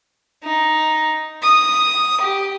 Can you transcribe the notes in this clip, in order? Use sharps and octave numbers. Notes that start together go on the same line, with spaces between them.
D#4
D#6
G4